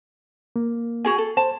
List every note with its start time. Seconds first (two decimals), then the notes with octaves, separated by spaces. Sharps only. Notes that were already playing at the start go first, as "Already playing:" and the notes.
0.56 A#3
1.05 F#4 G#4 G#5
1.18 A4
1.37 C5 A5